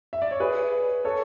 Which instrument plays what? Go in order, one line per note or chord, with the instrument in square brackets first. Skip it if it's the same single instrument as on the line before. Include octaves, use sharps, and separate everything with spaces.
[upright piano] E5
D5
C#5
G#4 B4
A4 C#5